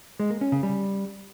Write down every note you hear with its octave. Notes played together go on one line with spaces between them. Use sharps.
G#3
A#3
C#4
C#3
G3